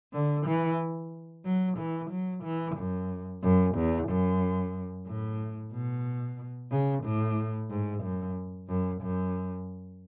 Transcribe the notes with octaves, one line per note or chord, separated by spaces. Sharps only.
D3
E3
F#3
E3
F#3
E3
F#2
F#2
E2
F#2
A2
B2
C#3
A2
G#2
F#2
F#2
F#2